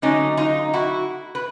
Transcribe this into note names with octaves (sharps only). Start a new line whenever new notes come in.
D3 F#3 A3 C#4 D#4
D#4 F4
E4 F#4
B4